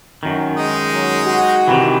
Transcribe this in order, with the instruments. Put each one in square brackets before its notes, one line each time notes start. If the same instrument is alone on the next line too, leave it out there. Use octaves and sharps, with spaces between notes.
[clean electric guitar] F#2 D#3
[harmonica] G#3 D#4
[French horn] F#3
F#4
[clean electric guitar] C3 D#3 E3